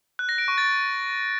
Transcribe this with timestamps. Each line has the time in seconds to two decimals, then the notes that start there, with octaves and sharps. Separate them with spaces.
0.19 F#6
0.29 A#6
0.38 D7
0.48 C#6
0.58 A6